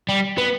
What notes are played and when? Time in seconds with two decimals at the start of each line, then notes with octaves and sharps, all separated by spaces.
0.09 G3
0.38 B3